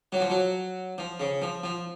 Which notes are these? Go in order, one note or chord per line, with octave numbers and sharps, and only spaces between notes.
F#3
F3
F#3
F3
C#3
F3
F3